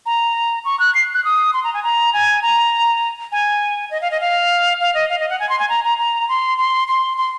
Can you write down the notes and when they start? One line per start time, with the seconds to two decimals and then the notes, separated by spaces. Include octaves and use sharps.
0.06 A#5
0.65 C#6
0.80 F#6
0.95 C7
1.14 F#6
1.24 D#6
1.53 C6
1.64 A#5
1.74 G#5
1.84 A#5
2.13 G#5
2.42 A#5
3.32 G#5
3.91 D#5
4.01 F5
4.11 D#5
4.20 F5
4.80 F5
4.95 D#5
5.09 F5
5.20 D#5
5.30 F#5
5.40 G#5
5.49 C6
5.59 G#5
5.69 A#5
5.84 A#5
5.98 A#5
6.29 C6
6.58 C6
6.88 C6
7.17 C6